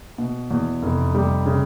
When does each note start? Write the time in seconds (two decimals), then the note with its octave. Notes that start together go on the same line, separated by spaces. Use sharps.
0.18 B2
0.51 E2
0.83 F1
1.15 G3
1.46 C#3